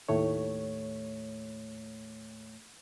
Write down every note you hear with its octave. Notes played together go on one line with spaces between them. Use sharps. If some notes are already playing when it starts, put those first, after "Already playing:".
D#2 A2 A3 C#5